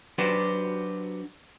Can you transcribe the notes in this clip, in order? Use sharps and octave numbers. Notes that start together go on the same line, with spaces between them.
F#3 D4 F#4 G4 B4 C5